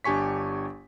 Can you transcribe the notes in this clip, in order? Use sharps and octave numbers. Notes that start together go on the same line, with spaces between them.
G1 D4 G4 G#5 C#6 B6